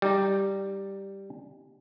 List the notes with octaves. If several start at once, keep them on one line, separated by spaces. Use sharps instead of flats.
G3 D#4